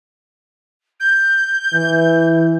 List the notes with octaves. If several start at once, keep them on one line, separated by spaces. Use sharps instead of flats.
G6
E3